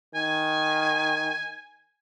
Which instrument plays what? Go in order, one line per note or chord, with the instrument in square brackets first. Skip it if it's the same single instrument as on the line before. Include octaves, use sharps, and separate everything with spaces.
[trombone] D#3 [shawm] G#5